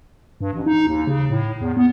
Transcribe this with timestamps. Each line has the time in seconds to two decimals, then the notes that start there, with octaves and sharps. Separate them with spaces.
0.41 G2
0.53 A1
0.66 D#4
0.87 D#2
1.07 C#3
1.30 A2
1.61 E2
1.77 B3